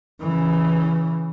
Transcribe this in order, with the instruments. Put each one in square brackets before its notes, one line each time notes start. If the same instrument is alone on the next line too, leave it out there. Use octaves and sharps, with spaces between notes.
[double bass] C#3 E3